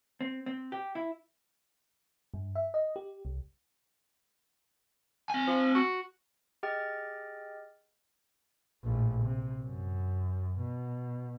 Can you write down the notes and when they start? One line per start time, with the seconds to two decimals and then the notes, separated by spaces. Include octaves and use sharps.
0.21 C4
0.46 C4
0.72 G4
0.95 E4
2.34 G2
2.55 E5
2.74 D#5
2.96 G4
3.25 C2
5.30 C4 G#5
5.47 F3
5.75 F#4
6.63 G4 G#4 D#5 G5 F6 A6
8.84 A#1 A2
9.23 C3
9.62 F#2
10.59 B2